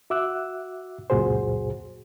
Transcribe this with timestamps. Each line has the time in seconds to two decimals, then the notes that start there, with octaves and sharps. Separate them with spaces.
0.10 F#4 E5 D6 E6 F#6
1.10 C#2 F#2 A#2 F#4 G#4 C5